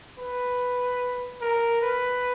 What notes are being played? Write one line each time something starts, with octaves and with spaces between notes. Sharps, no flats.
B4
A#4
B4